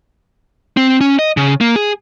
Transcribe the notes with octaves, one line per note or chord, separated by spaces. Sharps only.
C4
C#4
D#5
C#3
A#3
G#4